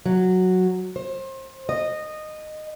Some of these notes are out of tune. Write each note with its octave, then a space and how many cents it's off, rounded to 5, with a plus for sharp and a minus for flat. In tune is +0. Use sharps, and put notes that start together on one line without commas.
F#3 -5
C5 +30
D#5 -15